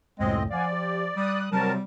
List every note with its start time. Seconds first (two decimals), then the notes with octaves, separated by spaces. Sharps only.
0.19 C#2 F#2 A2 G#3 C4 D#5
0.50 F3 D5 F5 F#5 G#5
0.72 G4
1.16 G3 D#6 F#6
1.52 C3 F#3 G3 C4 A#4 A5